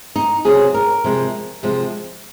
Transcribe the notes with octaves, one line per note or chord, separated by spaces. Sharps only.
D#4
C3 F#3 G#4
A#4
C3 F3 G#3
C3 F3 G#3